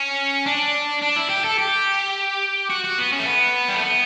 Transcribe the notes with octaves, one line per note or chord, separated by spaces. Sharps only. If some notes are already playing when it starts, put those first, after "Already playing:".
Already playing: C#4
D4
D4
E4
G4
A4
G4
F#4
F#4
B3
C#4
A3
B3
G3
A3
B3